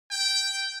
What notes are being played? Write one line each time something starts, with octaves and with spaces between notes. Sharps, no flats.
G5